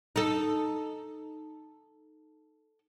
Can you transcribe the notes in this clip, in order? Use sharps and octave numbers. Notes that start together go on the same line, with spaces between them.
D#4 A4